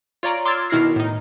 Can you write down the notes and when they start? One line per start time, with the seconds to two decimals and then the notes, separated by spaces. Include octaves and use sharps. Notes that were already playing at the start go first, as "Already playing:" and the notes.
0.23 F4 C#5 D5 A#5 D7
0.45 C6 D6 E6 F6 G#6 A6
0.70 B2 D#3 E4 F6 A#6 C7
0.96 A2 D#4